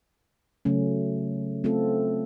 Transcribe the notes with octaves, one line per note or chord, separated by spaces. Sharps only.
C#3 F#3 A3 C#4
A3 C4 F4 A4